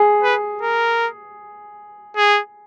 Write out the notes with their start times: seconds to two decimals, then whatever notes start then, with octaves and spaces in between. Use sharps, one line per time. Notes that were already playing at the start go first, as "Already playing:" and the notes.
Already playing: G#4
0.23 B4
0.62 A#4
2.17 G#4